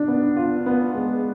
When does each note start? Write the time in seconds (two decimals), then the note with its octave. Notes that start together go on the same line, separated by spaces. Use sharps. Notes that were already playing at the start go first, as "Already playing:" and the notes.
Already playing: D4
0.08 B3
0.36 F4
0.66 B3
0.95 G#3